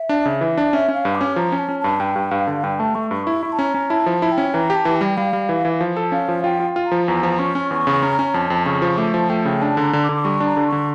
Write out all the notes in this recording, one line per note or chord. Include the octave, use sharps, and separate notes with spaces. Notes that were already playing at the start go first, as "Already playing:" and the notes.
Already playing: E5
D4
C#3
E3
D4
C#4 E5
C#4
F5
G2
D6
C#4
F3 A#5
C#4
A5
C#4
G2 A5
G2 G5
G2
G2 F5
D3
G2 G5
A3 A5
A3 C#6
G2 C#6
E4 C#6
E4
A5
C#4 A#5
C#4
E4 A5
F3 A5
E4
G5
C#4
E3 A#5
G4
A5
E3
G3 G5
G3 F5
G3
E3
E3
F3
A4
C#4 F5
F3
F4 G5
F4
F4
A#5
F3
E2 A#5
F3
C#4 C#6
C#4
E2 C#6
C#3
C#4 A#5
C#4
F2 A5
F2
C#3 C#6
F3
A3 D6
F3 A5
A3 G5
C#3 G5
D4 A5
D3 A#5
D3
D6
D3
D6
G3 C#6
D4
A#5
D3
C#6
D3